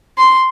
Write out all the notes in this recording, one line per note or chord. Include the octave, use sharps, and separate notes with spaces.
C6